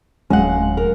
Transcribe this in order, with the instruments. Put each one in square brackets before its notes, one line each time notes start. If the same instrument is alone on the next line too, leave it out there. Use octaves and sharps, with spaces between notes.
[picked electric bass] D1 F#3 C#4 [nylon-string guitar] G#3 F5 F#5
[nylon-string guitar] A#4